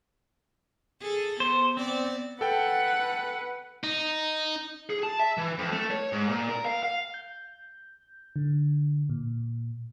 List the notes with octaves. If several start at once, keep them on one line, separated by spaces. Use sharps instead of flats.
G#4 A4
B3 C5
B3 C4 D5
A4 B4 F#5 G5
D#4
G#4
A5
E5
E3
F2
A3
C#5
G#2
A#2
A#4
F5
F5
G6
D3
A#2